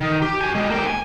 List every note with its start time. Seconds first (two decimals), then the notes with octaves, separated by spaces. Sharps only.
0.01 D#3
0.22 G4
0.41 F#4 G#5
0.55 G3 G#3
0.70 A#3 G5
0.87 G#5